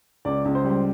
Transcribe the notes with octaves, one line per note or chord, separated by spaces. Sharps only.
C#2 D5
C#2
C5
G3
C5